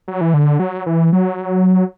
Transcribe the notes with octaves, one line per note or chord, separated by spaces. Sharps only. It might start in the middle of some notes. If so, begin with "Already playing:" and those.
F#3
E3
D3
F#3
E3
F#3